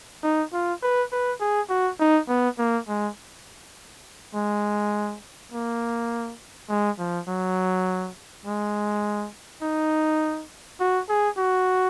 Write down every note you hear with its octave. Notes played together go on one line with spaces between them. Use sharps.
D#4
F4
B4
B4
G#4
F#4
D#4
B3
A#3
G#3
G#3
A#3
G#3
F3
F#3
G#3
D#4
F#4
G#4
F#4